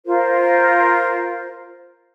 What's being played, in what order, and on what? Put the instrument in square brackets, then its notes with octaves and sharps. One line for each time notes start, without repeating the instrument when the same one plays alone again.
[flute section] F4 A#4 C5